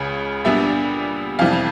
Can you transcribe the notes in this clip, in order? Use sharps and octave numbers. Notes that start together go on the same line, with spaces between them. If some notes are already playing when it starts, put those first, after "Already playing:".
Already playing: C#2 C#3
A#2 G3 B3 D4 E5
F2 C3 E3 G3 F5